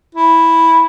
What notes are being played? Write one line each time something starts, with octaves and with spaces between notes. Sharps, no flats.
E4